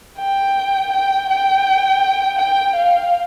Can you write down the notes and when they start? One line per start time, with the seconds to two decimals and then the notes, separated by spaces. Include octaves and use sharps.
0.19 G5
0.92 G5
1.30 G5
2.39 G5
2.76 F5